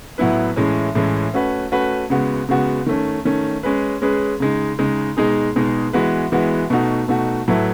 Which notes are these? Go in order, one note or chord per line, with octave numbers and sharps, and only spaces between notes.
A2 F#3 B3 E4 B4
A2 E3 G#3 C#4
A2 E3 G#3 C#4
A3 C#4 F#4 B4
A3 C#4 F#4 B4
C#3 G#3 B3 F#4
C#3 G#3 B3 F#4
D#3 A3 C#4
D#3 A3 C#4
G#3 C#4 G#4 B4
G#3 C#4 G#4 B4
C#3 G#3 D#4
C#3 G#3 D#4
B2 G#3 D#4 G#4
B2 G#3 D#4 G#4
E3 G#3 B3 F#4 B4
E3 G#3 B3 F#4 B4
B2 A3 D#4 F#4
B2 A3 D#4 F#4
A2 F#3 A3 E4 B4